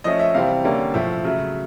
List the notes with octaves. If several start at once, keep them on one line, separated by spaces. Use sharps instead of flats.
F3 A3 C#4 D#5
E5
C3 E3 G3 C4 F5
D3 G3 A#3 C#4
A2 F3 A3 E5
C#3 F#3 A3